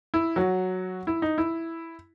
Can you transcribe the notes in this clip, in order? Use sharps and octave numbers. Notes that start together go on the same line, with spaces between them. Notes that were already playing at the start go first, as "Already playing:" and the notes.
E4
F#3 F#4
E4
D#4
E4